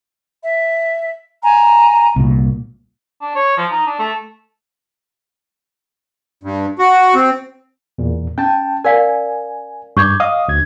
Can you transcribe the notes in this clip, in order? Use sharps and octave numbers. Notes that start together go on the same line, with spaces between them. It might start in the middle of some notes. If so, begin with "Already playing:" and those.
E5
G#5 A#5
C2 A#2
D4
C#5
F3
D#4
D4
A3
G2
F#4
C4
E2 A#2
C#4 G5 A5
A#4 D5 F5 G#5
G2 C#6 D6 G6 G#6
D#5 F5 D#6
D2 G#6